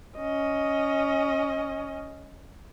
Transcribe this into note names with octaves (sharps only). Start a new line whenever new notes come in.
C#4 D#5